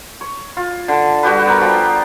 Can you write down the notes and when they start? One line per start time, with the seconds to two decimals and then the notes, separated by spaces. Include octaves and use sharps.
0.21 C#5
0.57 F4
0.88 D3 A5
1.23 G3 F#4 G4 B4
1.46 B3 A#4
1.61 F3 F4 G5